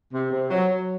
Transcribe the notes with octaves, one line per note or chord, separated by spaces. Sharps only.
C3
C3
F#3
F#3